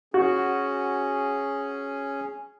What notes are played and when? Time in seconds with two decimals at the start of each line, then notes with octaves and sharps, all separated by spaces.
0.14 C#4 F#4 G#4